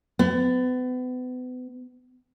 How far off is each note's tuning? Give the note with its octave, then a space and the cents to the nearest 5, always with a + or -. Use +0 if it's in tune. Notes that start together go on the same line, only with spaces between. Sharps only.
B3 +35